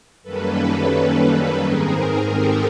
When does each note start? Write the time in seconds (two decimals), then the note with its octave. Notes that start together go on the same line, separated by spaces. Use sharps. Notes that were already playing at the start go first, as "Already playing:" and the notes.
0.23 F#2 D#3 G3 A#3 C#4 A4 B4
1.62 G#2 D#3 G#3 C4 G#4 A#4
2.31 G4 A4